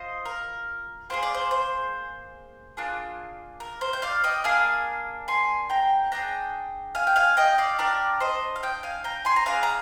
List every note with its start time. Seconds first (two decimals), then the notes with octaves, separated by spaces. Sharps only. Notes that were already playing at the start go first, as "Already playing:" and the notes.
Already playing: F4 C5 D#5
0.25 A#4
1.10 A#3 F4 G#4 C5
1.23 D5
1.34 C5
1.51 C5
2.77 A#3 D4 F4 G#4
3.60 A#4
3.81 C5
3.93 G5
4.02 D5 F5
4.24 D#5 G5
4.44 A#3 D4 G#4 F5 G#5
5.28 G#5 C6
5.70 G5 A#5
6.12 D4 G#4 G5 A#5
6.95 F5 G#5
7.07 G5
7.16 F5 G#5
7.37 D#5 G5
7.58 D5 F5
7.79 D4 G4 A#4 D5
8.20 C5 D#5
8.56 F5
8.63 D#5 G5
8.83 F5 G#5
9.04 G5 A#5
9.25 G#5 C6
9.36 A#5
9.46 D4 G#4 F5 G#5
9.63 A#5